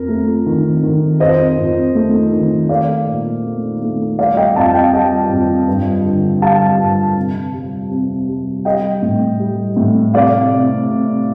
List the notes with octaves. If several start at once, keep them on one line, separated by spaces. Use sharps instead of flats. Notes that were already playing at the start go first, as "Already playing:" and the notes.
Already playing: F2 A#4
A3
D#3
D#3
F2 C5 D#5
F2
A3
D#3
A3 D5 F5
A#2
A3
A3
G3 D5 F5
D#5 G5
F2 F5 A5
D#5 G5
G3 D#5 G5
F2
G2
D3
G3 F5 A5
G2
C3
G3
C3
G3
G3 D#5 G5
A2
G3
A2
C3 D5 F5
C3
C3